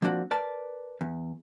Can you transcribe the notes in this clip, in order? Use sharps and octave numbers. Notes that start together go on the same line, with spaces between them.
F3 A#3 C4 D4 F#4
A#4 B4 D5 A5
E2